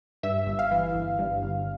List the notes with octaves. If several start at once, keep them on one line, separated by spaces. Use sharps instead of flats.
G2 E5
G1
F5
E3
G1
G2
G1